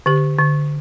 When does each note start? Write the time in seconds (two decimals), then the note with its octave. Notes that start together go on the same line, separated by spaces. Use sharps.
0.06 D3 G4
0.39 D3